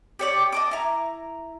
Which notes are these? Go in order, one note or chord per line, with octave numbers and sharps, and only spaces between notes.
G4 C#5 D5
D#5 A5 D6
E4 A#5